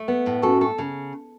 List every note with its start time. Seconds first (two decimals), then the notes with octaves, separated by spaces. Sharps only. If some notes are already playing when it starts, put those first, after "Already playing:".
Already playing: A3
0.08 B3
0.26 A2
0.43 C#4 F#4 A4
0.61 A4
0.78 C#3